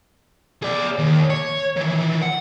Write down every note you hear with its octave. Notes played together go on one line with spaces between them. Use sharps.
G#4 D5
D#2
C#5
D#3 E3
F#5